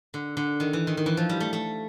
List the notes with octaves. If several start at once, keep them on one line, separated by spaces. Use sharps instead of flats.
D3
D3
D#3
E3
D#3
D#3
E3
F3
G3
A3
A3